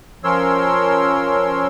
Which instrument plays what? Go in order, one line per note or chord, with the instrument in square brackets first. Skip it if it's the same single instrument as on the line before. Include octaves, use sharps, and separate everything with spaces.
[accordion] F3 C#4 A#4 C#5 C6 E6